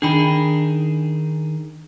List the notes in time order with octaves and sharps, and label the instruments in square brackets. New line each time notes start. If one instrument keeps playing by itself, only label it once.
[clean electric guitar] D#3 G#4 [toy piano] D4 G5 B5